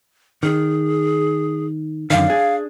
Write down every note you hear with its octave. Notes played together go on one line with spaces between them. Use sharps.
D#3 G#4
F#2 D3 D#3 F5
D4 G#4